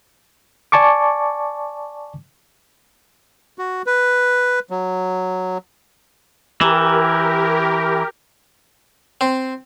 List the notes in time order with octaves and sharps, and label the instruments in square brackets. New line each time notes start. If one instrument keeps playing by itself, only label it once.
[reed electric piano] D5 G#5 A5 C#6 D6
[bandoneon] F#4
B4
F#3
[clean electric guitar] E3 [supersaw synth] G4 A#4
[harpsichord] C4